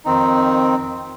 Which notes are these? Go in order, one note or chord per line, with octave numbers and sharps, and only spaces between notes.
F2 D#3 C4 D#4